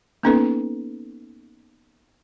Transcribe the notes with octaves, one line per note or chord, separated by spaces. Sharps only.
A#3 B3 C#4 D#4 A4 B4